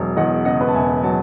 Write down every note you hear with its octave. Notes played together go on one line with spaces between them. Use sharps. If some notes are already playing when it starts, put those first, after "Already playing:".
Already playing: E1 F#3
E2 D#5 F#5
C#3 D#5 F#5
B4 D#5
A5
E1 E5 G#5
F#3 F#5 A5